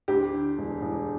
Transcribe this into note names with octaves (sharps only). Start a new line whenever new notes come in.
D2 G4
D3
E1
E1